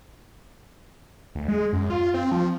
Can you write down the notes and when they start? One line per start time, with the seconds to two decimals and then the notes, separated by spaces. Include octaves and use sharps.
1.35 D2
1.48 G#3
1.73 F#2
1.90 F4
2.14 C4
2.32 F3